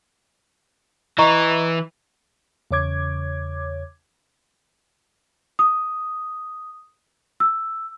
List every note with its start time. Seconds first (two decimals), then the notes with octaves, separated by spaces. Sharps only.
1.19 E3 D#5 A#5 C#6
2.71 E2 C#3 C#5 D6 G#6
5.59 D#6
7.40 E6